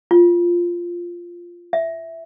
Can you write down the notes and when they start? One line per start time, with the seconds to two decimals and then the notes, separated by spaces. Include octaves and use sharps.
0.11 F4
1.73 E5